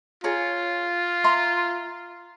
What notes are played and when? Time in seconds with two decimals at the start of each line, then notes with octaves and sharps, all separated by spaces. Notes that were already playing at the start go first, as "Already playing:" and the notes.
0.24 F4 G#4 C#5 A#5
1.24 E5 A#5 C6